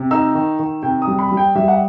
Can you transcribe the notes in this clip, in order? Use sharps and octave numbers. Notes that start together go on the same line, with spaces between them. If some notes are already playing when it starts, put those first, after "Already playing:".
Already playing: C3
D#4 E6
D#3
D#3
C3 G5
D#6
G3
B5
G3
G5
G3 E5
F#5